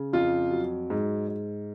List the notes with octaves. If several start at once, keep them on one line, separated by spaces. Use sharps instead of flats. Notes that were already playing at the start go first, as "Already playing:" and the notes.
Already playing: C#3
F2 F4
F#3
G#2
G#2